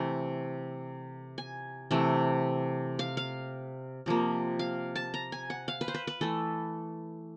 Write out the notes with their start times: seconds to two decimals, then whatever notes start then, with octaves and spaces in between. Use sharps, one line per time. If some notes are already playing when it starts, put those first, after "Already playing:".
Already playing: C3 E3 A3
1.38 G#5
1.91 C3 E3 A3
2.99 F5
3.17 F5
4.06 C3 F3 A#3
4.59 F5
4.96 A5
5.14 A#5
5.32 G#5
5.50 F#5
5.68 F5
5.81 B4
5.88 C5
5.94 B4
6.07 B4
6.21 E3 A3 A4